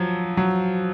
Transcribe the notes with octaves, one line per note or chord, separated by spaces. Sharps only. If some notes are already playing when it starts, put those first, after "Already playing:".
Already playing: F3 F#3
F#3